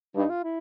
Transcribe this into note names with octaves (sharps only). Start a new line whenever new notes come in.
G2 D#4
F4
E4